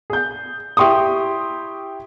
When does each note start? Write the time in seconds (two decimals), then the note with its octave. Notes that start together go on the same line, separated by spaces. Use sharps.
0.10 G#4 G6
0.77 E4 G4 G5 C6 C#6 D#6